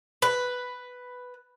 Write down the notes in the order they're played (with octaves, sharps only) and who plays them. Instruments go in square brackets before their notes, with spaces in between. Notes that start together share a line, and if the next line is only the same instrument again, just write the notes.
[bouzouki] B4